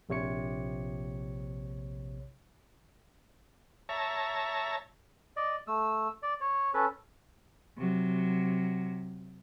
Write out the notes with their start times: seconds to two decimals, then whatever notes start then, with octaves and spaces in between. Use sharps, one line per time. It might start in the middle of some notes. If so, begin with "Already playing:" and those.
0.09 A#1 C3 C#5 C#7
3.89 C#5 E5 A5 A#5
5.37 D5 D#5
5.67 A3 E6
6.23 D5
6.41 C#5
6.74 C#4 A4 B4
7.77 C3 F#3